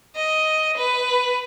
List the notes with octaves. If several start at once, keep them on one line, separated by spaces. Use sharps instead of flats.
D#5
B4